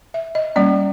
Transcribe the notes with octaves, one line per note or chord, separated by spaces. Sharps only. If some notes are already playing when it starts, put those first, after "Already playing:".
E5
D#5
G3 A#3 C#4 D5